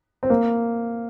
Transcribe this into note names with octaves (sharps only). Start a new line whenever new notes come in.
C4
A#3